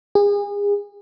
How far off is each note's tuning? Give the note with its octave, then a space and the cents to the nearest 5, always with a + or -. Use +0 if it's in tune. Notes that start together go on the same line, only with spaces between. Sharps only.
G#4 -35